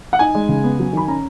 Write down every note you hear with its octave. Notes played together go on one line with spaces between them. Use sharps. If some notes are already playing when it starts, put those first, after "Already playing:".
F#5
D#4 G#5
G#3
C#3
B3
F#3
D#3 B5
C#4 A#5